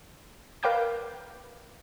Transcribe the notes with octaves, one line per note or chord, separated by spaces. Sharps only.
A#4 B4 F5 G5 D6 G6